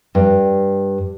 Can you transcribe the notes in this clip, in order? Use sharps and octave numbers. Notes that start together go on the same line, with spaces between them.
G2